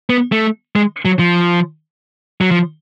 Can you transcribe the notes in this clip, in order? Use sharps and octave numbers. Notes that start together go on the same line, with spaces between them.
B3
A3
G#3
F#3
F3
F#3
F3